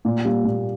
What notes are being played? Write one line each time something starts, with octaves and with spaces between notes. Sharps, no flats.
A#2
G3 A#3
A#2